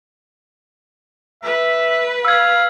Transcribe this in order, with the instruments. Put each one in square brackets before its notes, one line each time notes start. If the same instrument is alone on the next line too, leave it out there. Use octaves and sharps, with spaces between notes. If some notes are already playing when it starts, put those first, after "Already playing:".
[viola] B4 [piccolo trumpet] E5
[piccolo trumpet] F5 [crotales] E6 G#6